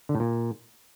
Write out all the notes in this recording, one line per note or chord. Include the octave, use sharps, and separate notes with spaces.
D3
A2
A#2